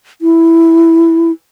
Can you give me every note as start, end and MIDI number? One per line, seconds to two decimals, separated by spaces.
0.22 1.31 64